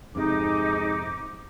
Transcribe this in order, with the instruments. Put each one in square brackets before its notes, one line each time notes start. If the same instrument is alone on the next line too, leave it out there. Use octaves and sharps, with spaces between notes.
[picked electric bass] F2 C3 [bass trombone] G#2 [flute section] D#4 [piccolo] D6